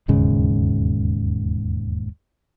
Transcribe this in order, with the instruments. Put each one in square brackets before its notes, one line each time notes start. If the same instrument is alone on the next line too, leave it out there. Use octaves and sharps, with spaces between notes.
[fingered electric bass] E1 D#2 G#2 C#3